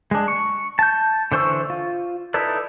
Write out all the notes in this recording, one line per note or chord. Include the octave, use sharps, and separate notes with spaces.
G#3 D4
C#6
A5 G6
D3 E3 C5 C#6 E6
F4
D#4 E4 A4 B4 D5